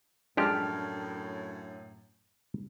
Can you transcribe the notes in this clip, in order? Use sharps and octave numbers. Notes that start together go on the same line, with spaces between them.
F#2 A2 F3 G#3 D4 G4 A5 F6